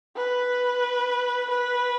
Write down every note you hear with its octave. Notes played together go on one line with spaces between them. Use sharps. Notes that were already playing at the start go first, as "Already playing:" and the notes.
B4
B4